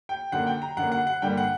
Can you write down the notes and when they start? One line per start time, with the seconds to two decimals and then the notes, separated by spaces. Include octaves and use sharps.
0.09 G5
0.32 F#2 D3 A#3 F#5
0.47 G5
0.62 A#5
0.77 F#2 D3 A#3 F#5
0.92 F#5
1.07 F#5
1.22 G2 D3 G3 A#3 G5
1.37 F#5